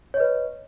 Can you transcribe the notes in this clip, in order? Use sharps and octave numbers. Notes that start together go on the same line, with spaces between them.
B4 C#5 D#5